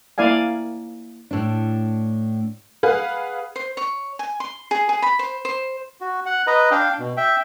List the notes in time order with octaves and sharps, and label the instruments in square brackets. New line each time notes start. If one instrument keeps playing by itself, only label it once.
[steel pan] A#3 E4 D5 F5 G#5
[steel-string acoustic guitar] A2 D4
[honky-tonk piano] G#4 B4 F5 F#5
[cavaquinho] C5
C#5
G#5
C6
G#4
G#4
B5
C5
C5
[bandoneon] F#4
F#5
B4 D#5 A#5
D4 F5 G5
B2
E5 G5